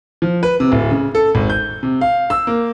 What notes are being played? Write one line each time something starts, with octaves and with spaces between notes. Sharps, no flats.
F3
B4
C3
D1
C#3
A4
G#1
G6
C3
F5
E6
A#3